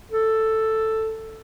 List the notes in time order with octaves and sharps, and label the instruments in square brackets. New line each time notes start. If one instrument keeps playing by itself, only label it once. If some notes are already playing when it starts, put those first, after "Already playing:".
[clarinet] A4